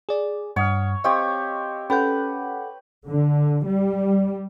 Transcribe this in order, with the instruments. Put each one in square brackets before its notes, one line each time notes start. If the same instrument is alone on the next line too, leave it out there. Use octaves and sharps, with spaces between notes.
[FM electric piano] G#4 D5
[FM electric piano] G2 [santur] C#5 [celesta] F#5 D#6 F6
[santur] C4 G4 C#5 [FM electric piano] D#5 [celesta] F5 C#6
[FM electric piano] C#4 A4 F#5 [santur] B4 [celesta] G5 G6
[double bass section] D3
G3